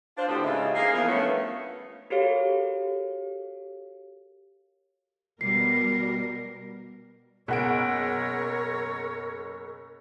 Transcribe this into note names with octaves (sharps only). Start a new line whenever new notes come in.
D4 F4 C5
A2 D3 B3 C4 F#4 G4
G#2 C#3 D#4 F4 E5
A#3 G#4
E2 F3 A#4
G2 F3 A3 B3 C#4 E5
F#4 G4 A4 A#4 C#5 F5
B2 G3 A#4 C7
F#1 B2 A#4 C#5 F#5 D7